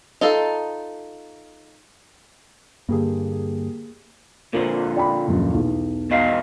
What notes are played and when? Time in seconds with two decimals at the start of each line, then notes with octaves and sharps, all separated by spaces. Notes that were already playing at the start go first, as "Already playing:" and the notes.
0.21 D#4 F4 A4
2.89 G2 D3 A#3 G4 G#4
4.53 A#2 D3 A#4 C5
4.96 D5 G5 B5
5.28 D#1 F#2 F3
5.54 B1 E2
6.11 B2 D#5 F5